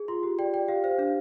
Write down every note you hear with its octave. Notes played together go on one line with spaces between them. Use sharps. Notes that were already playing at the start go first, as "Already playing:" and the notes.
Already playing: G#4
F4 C6
G4
D5 G5
D5 G5
G4 F5
C5 F5
D4 F5